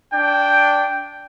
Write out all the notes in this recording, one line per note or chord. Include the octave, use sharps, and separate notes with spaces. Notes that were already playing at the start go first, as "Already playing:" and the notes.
D4 G5